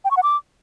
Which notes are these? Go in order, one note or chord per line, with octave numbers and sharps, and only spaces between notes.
G5
C#6
F#5
D6